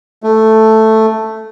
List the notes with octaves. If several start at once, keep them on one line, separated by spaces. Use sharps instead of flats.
A3